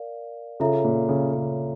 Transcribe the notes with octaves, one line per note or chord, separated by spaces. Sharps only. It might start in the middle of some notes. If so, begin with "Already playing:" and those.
Already playing: A#4 D5 F5
C#3 F4 A4 C#5 E5 A#5
A#2
C#3
C#3